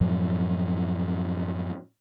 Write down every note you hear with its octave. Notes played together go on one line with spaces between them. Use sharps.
F#2 A2 F3 F#3